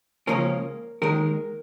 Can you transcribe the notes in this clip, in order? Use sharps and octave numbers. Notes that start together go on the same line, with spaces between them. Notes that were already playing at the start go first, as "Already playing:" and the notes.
C#2 C#3 F3 A#3 C#4 A#4
D#2 D#3 G#3 A#4